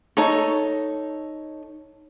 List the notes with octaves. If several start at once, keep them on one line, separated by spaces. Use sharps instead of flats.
D#4 A4 C#5